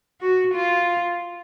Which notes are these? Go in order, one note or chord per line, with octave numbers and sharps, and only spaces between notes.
F#4
F4